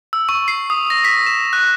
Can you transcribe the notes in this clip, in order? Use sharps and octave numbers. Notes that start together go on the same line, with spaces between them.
E6
C#6
C7
D#6
A#6
B6
E7
F#6